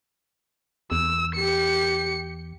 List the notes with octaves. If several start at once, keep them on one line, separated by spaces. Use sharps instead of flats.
E2 E6
G4 C#7